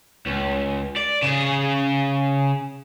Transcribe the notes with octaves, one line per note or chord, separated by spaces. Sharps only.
C#2
D5
C#3 G#4